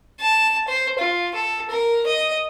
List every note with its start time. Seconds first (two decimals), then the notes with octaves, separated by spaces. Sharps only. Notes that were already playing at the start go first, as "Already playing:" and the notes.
0.21 A5
0.68 C5
0.98 F4
1.35 A4
1.71 A#4
2.07 D#5